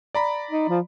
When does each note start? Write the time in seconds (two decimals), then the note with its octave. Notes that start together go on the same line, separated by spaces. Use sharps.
0.15 D5 A#5 B5
0.51 D#4
0.69 F3